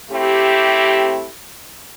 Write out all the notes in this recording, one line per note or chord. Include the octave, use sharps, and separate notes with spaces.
A3 C4 E4 G4